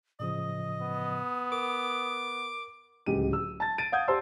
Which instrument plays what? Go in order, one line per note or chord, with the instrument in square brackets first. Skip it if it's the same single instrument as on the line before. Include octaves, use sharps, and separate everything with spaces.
[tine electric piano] A2 C#3 F3 [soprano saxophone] D#5 [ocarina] D#6
[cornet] B3
[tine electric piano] A#4 [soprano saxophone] D6
[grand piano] D1 C#2 G4 D#7
E6
A5 A6
A6 D7 D#7
F5 F#5 D#6 G6 G#6
G4 C5 D5 A5 C6 E6